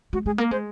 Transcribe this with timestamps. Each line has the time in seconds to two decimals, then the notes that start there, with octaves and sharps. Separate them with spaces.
0.13 G#3 F#4
0.26 G#3 G#4
0.38 A#3 A#4
0.51 G#3 C5